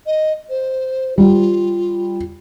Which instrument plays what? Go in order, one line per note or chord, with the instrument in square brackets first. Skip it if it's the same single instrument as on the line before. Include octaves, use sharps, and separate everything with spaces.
[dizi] D#5
C5
[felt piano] G3 [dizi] F4